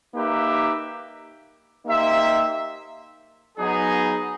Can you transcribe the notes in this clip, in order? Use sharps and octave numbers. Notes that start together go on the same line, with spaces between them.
A#3 D#4 G4 B4 E5
A#3 D#4 G4 C5 E5
F#3 B3 D#4 G#4